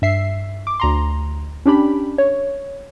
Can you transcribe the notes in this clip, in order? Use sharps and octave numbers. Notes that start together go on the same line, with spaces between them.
G2 E5 C7
D6
D2 A#5 C6
C#4 D4 G4 B5
C#5